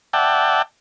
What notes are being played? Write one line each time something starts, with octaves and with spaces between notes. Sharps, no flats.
D5 E5 F#5 G5 A5